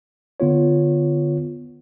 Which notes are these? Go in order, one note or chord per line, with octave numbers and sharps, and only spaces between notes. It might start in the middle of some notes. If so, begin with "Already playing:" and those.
D3 B3 F4 C#5